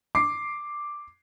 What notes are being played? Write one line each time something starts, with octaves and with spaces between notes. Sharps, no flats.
D6 C7